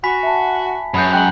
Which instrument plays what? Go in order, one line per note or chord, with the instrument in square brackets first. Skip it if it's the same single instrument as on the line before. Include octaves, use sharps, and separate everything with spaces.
[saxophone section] F#4 [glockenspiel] G#5 B5 B6
[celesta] E5 A5
[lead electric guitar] F#2 [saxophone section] G#4 B4 C#5 [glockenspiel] B5 G6
[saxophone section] G#3 [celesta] G5 [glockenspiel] F#6 F#7